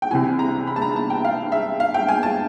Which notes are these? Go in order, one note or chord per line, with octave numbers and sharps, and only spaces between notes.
G5
C2 C3 E3 G#5
A#5
B5
A5
A#5
A5
G5
F5
E5
F5
G5
G#5
A5